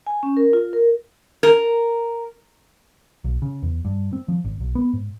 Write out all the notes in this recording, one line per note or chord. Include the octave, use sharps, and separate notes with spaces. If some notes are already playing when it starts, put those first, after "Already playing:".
G#5
C#4
A#4
F4
A#4
A#4
B1
C#3
E2
G2
C4
F3
G#1
B1
B3
G#2